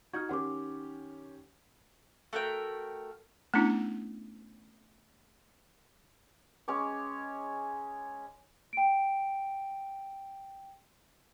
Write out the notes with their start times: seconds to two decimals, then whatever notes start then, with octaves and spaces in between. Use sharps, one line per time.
0.13 D#4 F#4 F6 G6 G#6
0.29 D#3 C#4 G4 F#5 C6 D6
2.33 A3 F#4 A#4 G5
3.54 A3 B3 C#4 D4 E4
6.68 G#3 C#4 C#5 D6
8.73 G5 D7